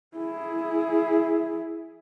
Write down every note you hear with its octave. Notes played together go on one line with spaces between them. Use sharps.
E4 G#4